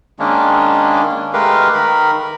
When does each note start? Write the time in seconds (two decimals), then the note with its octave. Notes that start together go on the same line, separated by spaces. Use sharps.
0.19 D#3 G#3 A#3 C#4 D4
1.33 G#3 A3 G4 A#4 B4 F5
1.74 D#3 A#4 B5